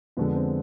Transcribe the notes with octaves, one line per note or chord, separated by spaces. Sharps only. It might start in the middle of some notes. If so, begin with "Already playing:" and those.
F2 D3 G#3 B3
C4